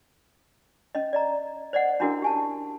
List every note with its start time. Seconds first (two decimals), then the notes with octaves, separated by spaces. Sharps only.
0.95 C#4 D#5
1.13 D5 D#5 A#5
1.73 C5 D5 D#5 F#5
2.00 C#4 D4 E4 F#4 G#4 A#4
2.22 G4 G#5 A5